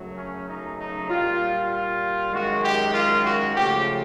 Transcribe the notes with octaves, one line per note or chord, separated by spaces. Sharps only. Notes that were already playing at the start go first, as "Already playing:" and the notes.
Already playing: F#2 C#3 F#3 A3
C#4
D#4
D#4
A#2 G3 F4
F4
F#2 D#3 G#3 F#4
G4
F4
F#4
C#3 F3 A3 G4